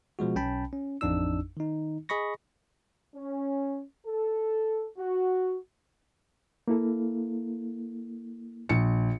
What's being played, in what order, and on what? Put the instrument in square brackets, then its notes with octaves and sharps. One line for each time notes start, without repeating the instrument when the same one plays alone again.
[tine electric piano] B2 F3 G#3 F#4
B1 C#4 G5 A5 B5
C#4
A1 F2 D4 D#4 E6
D#3 D#4
G#4 D#5 B5 C#6 A#6
[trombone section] C#4
A4
F#4
[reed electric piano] A#3 E4 A4
[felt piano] A#1 C#7